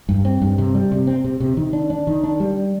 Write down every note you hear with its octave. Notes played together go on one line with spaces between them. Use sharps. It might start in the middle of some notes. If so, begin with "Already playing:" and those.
G2
C4
G2
C3
G3
C3
C4
C3
C3
D#3
D4
D4
D#3
D4
G3